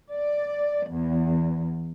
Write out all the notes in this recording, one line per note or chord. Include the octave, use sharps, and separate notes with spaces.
D5
E2